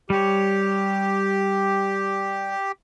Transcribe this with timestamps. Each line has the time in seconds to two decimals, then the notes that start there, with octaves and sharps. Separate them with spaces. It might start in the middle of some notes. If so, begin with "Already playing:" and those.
0.10 G3 G4 C#5